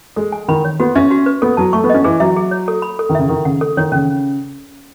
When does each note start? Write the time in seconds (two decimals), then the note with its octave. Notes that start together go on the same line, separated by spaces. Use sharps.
0.16 G#3 A4
0.32 G#5
0.48 D#3 B5
0.65 C#5
0.80 B3 F#4
0.95 C#4 E5
1.11 F#4
1.26 B4
1.42 B3 A4
1.57 F#3 A5
1.73 A3 C#6
1.84 B3
1.90 C#4 D#5
2.04 E3 G#4
2.20 F#3 E5
2.36 G#4
2.51 C#5
2.68 A4
2.82 B5
2.99 A4
3.09 D#3
3.15 C#3 E5
3.29 D#3 A4
3.45 C#3 F#5
3.61 A4
3.77 D#3 C#5
3.92 C#3 C#4